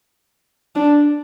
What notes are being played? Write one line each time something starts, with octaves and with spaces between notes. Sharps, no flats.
D4